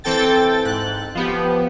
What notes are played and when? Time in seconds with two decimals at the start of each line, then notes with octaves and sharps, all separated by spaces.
0.04 E3 C4 A4 G5 A6
0.65 G#2 F#6
1.15 F3 B3 G4